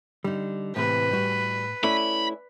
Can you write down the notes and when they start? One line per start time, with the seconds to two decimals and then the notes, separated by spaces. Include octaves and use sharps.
0.24 D3 G3 D#4
0.76 A2 C3 E3 A#3 B4
1.11 G3 F#4
1.84 A3 C#4 E4 D5 B5